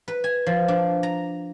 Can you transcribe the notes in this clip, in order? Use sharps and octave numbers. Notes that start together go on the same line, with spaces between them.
B4
G#5
F3
D4
A#5